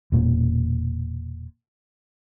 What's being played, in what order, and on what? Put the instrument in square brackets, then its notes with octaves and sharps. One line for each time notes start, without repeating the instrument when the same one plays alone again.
[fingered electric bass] E1 A#2